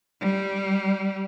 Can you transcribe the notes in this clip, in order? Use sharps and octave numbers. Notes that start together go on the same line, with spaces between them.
G3